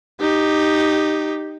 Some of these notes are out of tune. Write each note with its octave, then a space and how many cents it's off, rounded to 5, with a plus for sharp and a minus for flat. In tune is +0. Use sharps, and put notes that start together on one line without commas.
D#4 -10 G4 +0